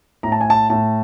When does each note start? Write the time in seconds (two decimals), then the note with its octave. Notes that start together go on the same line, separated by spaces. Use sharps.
0.23 A2 A#5
0.32 A5
0.41 G#5
0.50 A5
0.70 A2 A5